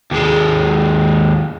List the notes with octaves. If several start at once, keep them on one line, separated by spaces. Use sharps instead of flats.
D#2 G#3